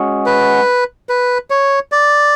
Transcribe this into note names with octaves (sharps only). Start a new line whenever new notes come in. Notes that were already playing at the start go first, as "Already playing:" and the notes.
Already playing: G#3 C#4 F#4
B4
B4
C#5
D5